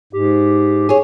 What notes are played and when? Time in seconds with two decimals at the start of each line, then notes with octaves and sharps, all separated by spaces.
0.13 G#2 G4
0.89 G#4 C#5